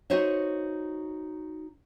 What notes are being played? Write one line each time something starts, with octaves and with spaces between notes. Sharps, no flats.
D#4 F#4 C5 C#5 D#5 E5